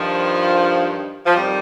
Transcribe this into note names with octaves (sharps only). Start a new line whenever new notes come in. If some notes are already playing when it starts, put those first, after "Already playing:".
Already playing: G2 D#3 F3
F3
F2 D#3 G3